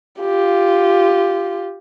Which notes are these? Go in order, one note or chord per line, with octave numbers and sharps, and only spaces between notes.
F4 G4